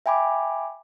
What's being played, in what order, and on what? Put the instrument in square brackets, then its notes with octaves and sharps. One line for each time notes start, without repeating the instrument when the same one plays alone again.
[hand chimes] E5 G5 G#5 B5 D6